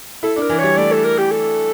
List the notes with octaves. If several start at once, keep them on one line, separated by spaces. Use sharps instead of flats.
E4 A4
D4
A#4
E3
G3 C#5
A3 D5
A4
A#4
G4
A4